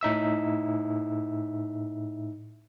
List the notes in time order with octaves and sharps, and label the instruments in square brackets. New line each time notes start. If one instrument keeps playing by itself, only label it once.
[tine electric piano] A2 D#4 E5 E6